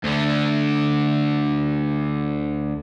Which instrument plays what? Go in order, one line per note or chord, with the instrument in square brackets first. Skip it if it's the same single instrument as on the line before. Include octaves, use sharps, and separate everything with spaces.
[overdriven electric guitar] D2 D3